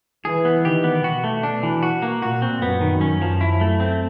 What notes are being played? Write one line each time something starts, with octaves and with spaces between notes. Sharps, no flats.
E3 G#4
B3
D#3 G4
B3
B2 F#4
A3
B2 D4
E3
F#4
A#3
A#2 F#4
C4
F#2 B3
D#3
F#2 C#4
F3
E4
A3
C4